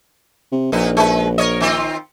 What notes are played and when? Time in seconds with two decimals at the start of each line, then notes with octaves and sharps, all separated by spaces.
0.52 C3
0.72 A#1 F2 D#4 B4
0.97 G#3 B4
1.38 A#4 C#5 D#5
1.60 D#3 C4 F4